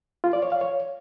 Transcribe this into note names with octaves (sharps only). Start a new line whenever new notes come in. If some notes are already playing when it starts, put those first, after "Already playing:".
F4
D5
C#5
F5
C#5